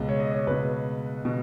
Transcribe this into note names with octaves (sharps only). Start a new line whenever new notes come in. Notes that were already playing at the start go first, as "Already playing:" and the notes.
Already playing: C#2 B2
C#5
D#5
C#5
C#2 B2 B4
B2